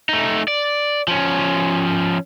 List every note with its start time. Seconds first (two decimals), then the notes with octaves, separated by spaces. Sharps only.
0.09 A3 D#4
0.48 D5
1.08 F3 C#4